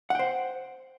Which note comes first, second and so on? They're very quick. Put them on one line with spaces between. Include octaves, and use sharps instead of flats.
F#5 G5 C5